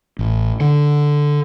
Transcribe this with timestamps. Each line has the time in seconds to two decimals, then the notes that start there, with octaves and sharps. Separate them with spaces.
0.19 A1
0.60 D3